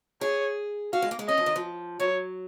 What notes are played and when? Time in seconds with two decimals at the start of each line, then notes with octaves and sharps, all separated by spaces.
0.21 G#4 C#5
0.93 F#4 F5
1.02 G#3
1.11 A#3
1.19 G#3
1.28 C#4 D#5
1.38 F3
1.46 D#3
1.56 F3
2.00 F#3 C#5